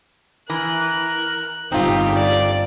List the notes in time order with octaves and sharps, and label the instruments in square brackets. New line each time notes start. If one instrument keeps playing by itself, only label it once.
[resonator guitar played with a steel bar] E3 [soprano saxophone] A#4 [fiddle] F#6
[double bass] G1 G2 [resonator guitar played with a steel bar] C4 F4 [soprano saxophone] D#4 [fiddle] G4
[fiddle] D5